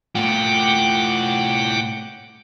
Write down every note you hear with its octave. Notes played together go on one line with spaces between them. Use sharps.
A2 F4 F#5 G5 D6